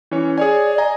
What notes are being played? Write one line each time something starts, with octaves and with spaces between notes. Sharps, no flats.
E3 C#4 C#5
G#4 C#5 D5 G#5
D#5 G#5 A#5